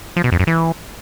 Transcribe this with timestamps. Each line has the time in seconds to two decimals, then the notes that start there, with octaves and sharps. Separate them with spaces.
0.16 F3
0.24 B2
0.32 F2
0.40 F#2
0.47 E3